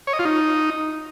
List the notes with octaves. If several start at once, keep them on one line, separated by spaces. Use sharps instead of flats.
C#5
D#5
F4
D#4